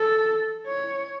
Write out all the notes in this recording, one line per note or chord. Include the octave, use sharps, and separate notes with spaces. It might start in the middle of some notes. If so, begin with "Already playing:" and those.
Already playing: A4
C#5